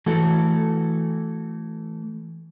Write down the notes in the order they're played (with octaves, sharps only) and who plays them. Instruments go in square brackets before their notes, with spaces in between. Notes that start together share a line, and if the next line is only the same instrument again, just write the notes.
[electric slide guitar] E3 A3 F#4 A4